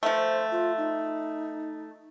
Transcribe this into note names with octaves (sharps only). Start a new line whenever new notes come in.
F3 A3 C5
F4
D#4